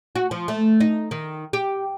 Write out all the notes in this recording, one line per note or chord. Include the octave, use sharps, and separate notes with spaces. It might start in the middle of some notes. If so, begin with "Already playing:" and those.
F#4
F3
A3
D#4
D#3
G4